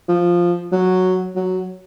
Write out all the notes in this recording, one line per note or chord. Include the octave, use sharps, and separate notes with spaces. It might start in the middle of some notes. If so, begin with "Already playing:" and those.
F3
F#3
F#3